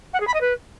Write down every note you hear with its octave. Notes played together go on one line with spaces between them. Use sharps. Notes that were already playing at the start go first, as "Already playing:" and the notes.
F#5
G#4
B5
D#5
B4